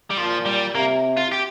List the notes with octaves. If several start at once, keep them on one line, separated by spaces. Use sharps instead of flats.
G3
A#2 F3
G3
C3 A#3
F4
G4